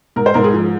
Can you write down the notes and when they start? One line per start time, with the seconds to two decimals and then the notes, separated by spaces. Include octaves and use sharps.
0.16 G#2 A#4
0.26 C5
0.34 G#2 A#4
0.44 G#4
0.53 F3